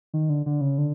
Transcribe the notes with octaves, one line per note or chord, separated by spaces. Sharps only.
D#3
D3
D3
C#3
D3